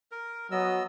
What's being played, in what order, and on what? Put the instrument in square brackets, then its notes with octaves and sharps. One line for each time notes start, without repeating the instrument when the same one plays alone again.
[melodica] A#4
[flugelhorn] F#3 [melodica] B3 D#5 E6